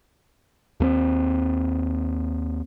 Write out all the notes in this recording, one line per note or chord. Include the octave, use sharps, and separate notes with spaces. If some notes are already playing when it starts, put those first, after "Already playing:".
D#2 A3 C4